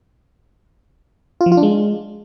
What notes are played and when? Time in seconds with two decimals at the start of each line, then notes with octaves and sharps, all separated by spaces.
1.41 F4
1.46 F3
1.52 F4
1.57 D4
1.63 G#3